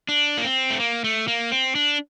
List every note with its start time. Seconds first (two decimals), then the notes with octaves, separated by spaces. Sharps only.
0.09 D4
0.37 A#3
0.44 C4
0.70 A3
0.80 A#3
1.04 A3
1.28 A#3
1.52 C4
1.75 D4